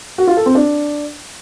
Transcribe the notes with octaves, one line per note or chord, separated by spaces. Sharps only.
F#4
F4
A4
C4
D4